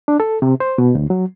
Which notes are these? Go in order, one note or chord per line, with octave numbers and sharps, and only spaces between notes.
D4
A4
C3
C5
B2
D2
F#3